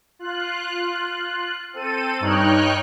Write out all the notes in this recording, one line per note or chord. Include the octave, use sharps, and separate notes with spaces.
F4 F#6
C4 A4 D#7
G2 D#4 C#5 G5 F6 F#6